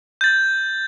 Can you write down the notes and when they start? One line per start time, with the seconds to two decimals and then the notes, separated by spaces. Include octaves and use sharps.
0.21 G6 A6